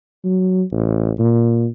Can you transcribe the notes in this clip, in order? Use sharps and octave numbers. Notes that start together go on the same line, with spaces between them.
F#3
A1
A#2